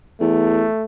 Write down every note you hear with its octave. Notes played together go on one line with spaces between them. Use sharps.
E2 A3